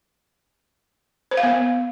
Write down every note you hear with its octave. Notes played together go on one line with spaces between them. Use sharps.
C5
F5
B3